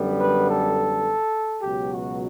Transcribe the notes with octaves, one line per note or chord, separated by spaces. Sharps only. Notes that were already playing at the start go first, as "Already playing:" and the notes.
Already playing: F#2 D3 G3 B3
B4
A4
C#2 B2 F#3 G4
F#4